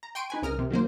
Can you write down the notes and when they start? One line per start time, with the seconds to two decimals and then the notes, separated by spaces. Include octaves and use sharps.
0.03 A#5
0.15 G5 C6 C#6 D7 D#7
0.30 D#4 B4 G#5
0.42 C2 C#3 A#4 D#6 F6
0.59 C3
0.71 D#3 F#3 A#3 C5